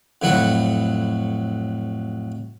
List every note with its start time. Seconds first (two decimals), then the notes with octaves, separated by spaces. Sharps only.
0.22 F2 A2 F#3 F#4 B4 F#5